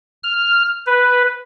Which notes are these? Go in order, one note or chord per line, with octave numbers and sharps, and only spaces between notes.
F6
B4